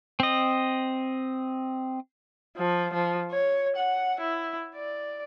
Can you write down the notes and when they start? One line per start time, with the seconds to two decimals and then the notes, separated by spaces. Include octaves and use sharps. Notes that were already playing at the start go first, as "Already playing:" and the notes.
0.20 C4 D#5
2.57 F3
2.93 F3
3.31 C#5
3.76 F#5
4.20 E4
4.75 D5